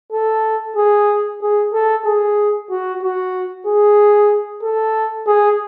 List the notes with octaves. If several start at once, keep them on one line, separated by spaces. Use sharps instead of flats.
A4
G#4
G#4
A4
G#4
F#4
F#4
G#4
A4
G#4